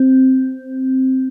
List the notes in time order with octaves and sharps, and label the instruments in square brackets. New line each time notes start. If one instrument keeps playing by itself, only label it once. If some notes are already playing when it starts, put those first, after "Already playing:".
Already playing: [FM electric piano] C4